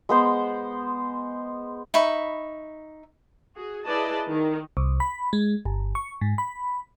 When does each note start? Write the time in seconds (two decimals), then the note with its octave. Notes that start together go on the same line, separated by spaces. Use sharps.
0.09 G#3 B3 C5 F#5
1.94 D#4 E5 B5 C#6
3.55 F#4 G#4
3.85 E4 G#4 B4 D5 D#5 A5
4.30 D#3
4.77 C2
5.00 B5
5.33 G#3
5.65 G1
5.95 C#6
6.21 G#2
6.38 B5